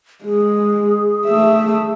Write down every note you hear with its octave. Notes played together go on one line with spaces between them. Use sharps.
G#3 G#4
A3 E5